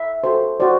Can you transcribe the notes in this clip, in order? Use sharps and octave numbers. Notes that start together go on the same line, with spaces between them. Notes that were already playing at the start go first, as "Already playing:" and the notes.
Already playing: E5
F#4 A4 C5
F#4 C5 D5